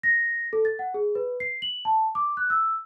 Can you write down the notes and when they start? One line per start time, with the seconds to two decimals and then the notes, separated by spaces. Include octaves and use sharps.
0.03 A#6
0.53 A4
0.65 A6
0.79 F#5
0.94 G#4
1.15 B4
1.40 C7
1.62 F#7
1.85 A5
2.15 D6
2.37 F#6
2.50 E6